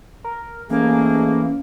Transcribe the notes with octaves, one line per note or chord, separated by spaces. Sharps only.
A#4
G#2 E3 A3 A#3 C#4 G#4